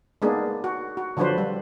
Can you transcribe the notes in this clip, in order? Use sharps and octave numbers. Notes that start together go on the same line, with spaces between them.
G#3 A#3 B3 D4 D#4 G#4
F#4
F#4
D3 F3 F#3 D4 B4 C5
G3